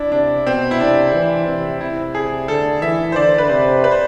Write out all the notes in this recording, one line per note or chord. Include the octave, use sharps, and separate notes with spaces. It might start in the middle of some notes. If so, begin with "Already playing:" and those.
Already playing: D4 E4
C3 D4
B2 C4
E4
C3 D4
E3
C3
C3 E4
G#4
D3 A4
E3 E5
C5
D3 D5
B4
C3 C5
B4
C5